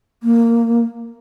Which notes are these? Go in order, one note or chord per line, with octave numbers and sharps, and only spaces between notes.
A#3